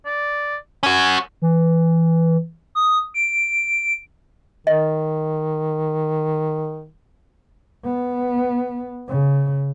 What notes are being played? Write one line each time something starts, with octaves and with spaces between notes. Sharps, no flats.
D5
C#4 F#4 G#5
E3
D#6
D7
D#3 D#5
B3
C#3